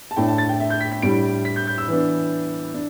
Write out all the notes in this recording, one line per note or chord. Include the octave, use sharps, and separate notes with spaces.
A5
A2 A3 D4 G5
A5
A6
G5
E5
G6
B6
B6
A2 G3 D4 D7
B6
G6
G6
E6
E3 B3 D4
D4